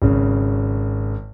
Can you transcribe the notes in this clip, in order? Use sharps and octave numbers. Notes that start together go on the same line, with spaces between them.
G#1 C#3